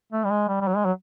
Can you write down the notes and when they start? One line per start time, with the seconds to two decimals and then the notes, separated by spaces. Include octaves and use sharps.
0.12 A3
0.24 G3
0.31 G#3
0.48 G3
0.61 G3
0.68 F#3
0.76 G#3
0.85 F#3